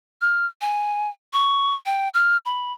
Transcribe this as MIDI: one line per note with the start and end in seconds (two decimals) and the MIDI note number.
0.21 0.46 89
0.61 1.09 80
1.33 1.74 85
1.86 2.09 79
2.14 2.37 89
2.45 2.72 83